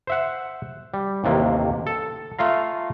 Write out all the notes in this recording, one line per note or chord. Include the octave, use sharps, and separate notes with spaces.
C5 E5 F#5
G3
A1 D#2 C3 A#3
A4
A3 F4 F5 A#5